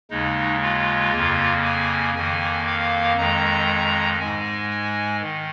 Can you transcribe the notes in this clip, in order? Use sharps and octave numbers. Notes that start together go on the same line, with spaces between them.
D#2 C#3 G#3 D#4
F4
F2 C#3 A#3
G#5
F2 D#3 A#3 G#5
F5
F2 D#3 G#3 A#5
G#2 G#3 G#5
G#5
D#3